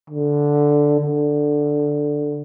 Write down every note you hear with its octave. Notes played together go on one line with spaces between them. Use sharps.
D3
D3